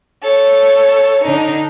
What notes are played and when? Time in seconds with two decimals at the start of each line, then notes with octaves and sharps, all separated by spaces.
0.23 A4 C#5
1.25 D3 D4 D#4